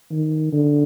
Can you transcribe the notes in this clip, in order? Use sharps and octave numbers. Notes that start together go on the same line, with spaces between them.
D#3
D3